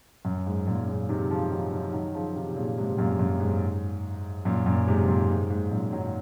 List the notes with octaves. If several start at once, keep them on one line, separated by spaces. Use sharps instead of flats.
F#2
G#2
F#2 A#2
A#2 C#3
C3 D#3
C#3 F3
D#3 F#3
D#3 F#3
D#3 F#3
C#3 F3
C3 D#3
A#2 C#3
G#2 C3
F#2 A#2
F#2
G#2
F#2 A#2
F#2 A#2
G#2 C3
F#2 A#2
G#2
G#2
F#2 A#2
D#3 F#3